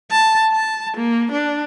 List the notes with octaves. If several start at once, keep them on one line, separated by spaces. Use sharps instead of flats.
A5
A5
A#3
D4